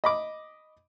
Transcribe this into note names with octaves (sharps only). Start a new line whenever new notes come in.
D#5 B5 D6